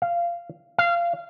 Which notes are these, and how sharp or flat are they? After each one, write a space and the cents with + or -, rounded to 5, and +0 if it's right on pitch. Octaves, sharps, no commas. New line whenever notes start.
F5 -15
F5 -20